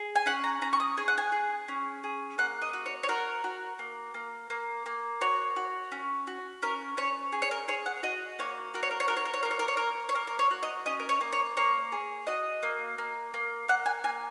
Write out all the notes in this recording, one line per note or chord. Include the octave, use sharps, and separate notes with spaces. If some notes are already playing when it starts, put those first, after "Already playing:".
Already playing: G#4
G#5
C#4 F#5
A#5
C#4 A#5
C#6
D#6
G#4 G#5
F#5
G#5
G#4
C#4
G#4
A#3 F#5
D#5
F#4
C#5
C#5
F#4 A#4
F#4
A#3
A#3
A#3
A#3
F#4 C#5
F#4
C#4
F#4
C#4 A#4
C#4 C#5
G#4
C#5
A#4
G#4 C#5
F#5
F#4 D#5
A#3 C#5
F#4 A#4
C#5
A#4
C#5
F#4 A#4
C#5
A#4
C#5
A#3 A#4
C#5
A#4
C#5
A#3 A#4
C#5
A#3 A#4
A#4
C#5
F#4
D#5
C#4 D#5
A#4
C#5
A#3
C#5
A#3 C#5
G#4
F#4 D#5
A#3
A#3
A#3
A#3 F#5
G#5
A#3 G#5